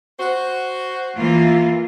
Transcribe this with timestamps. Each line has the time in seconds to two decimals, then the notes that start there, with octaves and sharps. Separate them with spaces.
0.19 F#4 C5
1.17 E3 A#3 F4